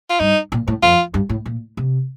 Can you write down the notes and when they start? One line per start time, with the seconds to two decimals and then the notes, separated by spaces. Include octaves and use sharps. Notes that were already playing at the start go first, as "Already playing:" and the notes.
0.10 F4
0.20 G2 D#4
0.52 A#2
0.68 A2
0.82 F2 F4
1.14 G2
1.29 A2
1.46 A#2
1.77 C3